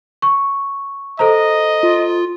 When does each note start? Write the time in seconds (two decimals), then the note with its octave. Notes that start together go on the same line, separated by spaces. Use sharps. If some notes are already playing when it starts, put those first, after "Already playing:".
0.22 C#6
1.19 A4 C5 D#5 A#5
1.83 F4